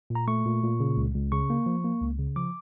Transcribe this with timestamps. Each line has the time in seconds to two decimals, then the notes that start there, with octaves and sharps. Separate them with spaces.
0.10 A#2
0.15 A#5
0.28 A3 C#6
0.45 A#2
0.63 A#2
0.80 C#3
0.97 C#2
1.14 C#2
1.32 C#3 C#6
1.50 A#3
1.66 F3
1.85 A#3
2.01 C#2
2.19 C#3
2.36 F3 D6